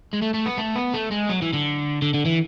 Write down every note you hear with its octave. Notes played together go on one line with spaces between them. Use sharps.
G#3
A3
A3
B3
A3
B3
A3
G#3
F#3
E3
D3
D3
D3
E3